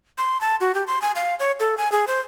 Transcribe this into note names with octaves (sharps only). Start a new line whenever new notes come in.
C6
A5
F#4
G4
C6
G#5
F5
C#5
A4
G#5
G#4
C5